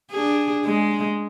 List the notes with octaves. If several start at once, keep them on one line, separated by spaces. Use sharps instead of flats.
D4 G#4
G#3